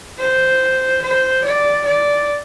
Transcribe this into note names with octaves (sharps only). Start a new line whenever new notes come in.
C5
C5
D5
D5